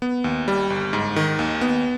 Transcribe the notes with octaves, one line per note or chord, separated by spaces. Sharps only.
B3
D#2
G3
G1
G#2
D#3
D#2
B3